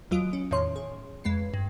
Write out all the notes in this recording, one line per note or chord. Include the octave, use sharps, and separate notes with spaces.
D#2 F#3 F4 D#6 D7
C#4
E2 A2 D#3 C#5 C6
G#4
F2 G#3 B4 C7
G2